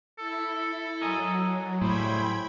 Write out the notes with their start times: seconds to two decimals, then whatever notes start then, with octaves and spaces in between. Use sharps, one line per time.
0.19 E4 A4
1.02 F#3 A#4 D#5 G#5
1.82 A2 C#3 G3 E4 C5 G5 B5 G#6